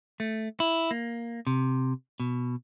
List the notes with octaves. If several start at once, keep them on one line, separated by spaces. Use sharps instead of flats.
A3
E4
A#3
C3
B2